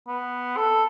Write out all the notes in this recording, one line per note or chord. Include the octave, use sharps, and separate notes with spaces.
B3
A4